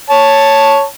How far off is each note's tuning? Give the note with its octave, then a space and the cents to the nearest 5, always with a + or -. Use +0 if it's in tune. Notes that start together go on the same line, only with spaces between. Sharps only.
C#5 +0 A5 +0